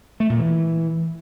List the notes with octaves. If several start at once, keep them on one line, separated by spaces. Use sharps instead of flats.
A3
A#2
E3